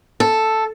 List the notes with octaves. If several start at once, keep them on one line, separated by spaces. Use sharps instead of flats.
A4